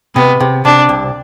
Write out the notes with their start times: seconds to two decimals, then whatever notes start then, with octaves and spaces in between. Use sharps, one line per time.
0.15 C3 B3
0.40 C3
0.65 C3 D4
0.89 C2